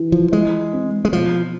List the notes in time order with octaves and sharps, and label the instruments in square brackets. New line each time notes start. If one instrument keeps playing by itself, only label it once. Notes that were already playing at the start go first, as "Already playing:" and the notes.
Already playing: [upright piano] E3
[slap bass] F3
[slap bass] G#3 [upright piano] E4
[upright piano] C4
[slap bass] G#3
[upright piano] B2 [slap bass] F3